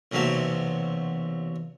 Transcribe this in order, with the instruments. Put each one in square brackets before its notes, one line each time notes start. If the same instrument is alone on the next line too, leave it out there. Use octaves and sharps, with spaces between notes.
[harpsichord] B1 E2 C3 F#3 A#3 A5